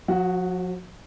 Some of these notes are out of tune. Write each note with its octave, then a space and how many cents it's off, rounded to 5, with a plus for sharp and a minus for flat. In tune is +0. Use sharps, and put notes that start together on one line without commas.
F3 +45 F#4 +0